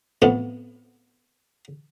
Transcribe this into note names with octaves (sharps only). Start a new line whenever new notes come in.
F2 A2 B3